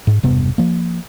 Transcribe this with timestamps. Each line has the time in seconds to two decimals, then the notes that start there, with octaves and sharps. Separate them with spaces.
0.07 G#2
0.23 E1 G2 C3 B3
0.58 F3 A#3